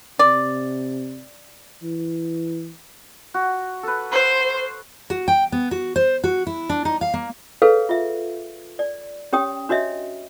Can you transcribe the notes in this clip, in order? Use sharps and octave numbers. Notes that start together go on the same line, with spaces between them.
C3 D5
E3
F#4
A4 B4
C5
F#4
G5
B3
F#4
C5
F#4
E4
D4
D#4
F5
A#3
G#4 A4 B4 C#5 F5
F4 E5
D5
C#4 G4 C#5 G5 D#6
D4 F#4 C#5 D#5 E5